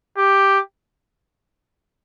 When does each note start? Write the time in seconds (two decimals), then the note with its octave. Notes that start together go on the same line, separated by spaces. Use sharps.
0.18 G4